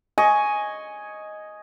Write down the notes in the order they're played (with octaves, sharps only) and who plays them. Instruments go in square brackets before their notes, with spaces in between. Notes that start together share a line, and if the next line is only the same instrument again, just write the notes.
[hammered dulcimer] D#5 G#5 C#6